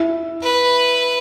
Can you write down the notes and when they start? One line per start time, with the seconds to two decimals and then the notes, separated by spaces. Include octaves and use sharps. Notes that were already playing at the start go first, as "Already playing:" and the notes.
Already playing: E4
0.43 B4